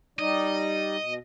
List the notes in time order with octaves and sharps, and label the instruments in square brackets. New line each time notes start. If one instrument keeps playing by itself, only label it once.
[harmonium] G3 D#4 D5 [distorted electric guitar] D#5
[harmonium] B2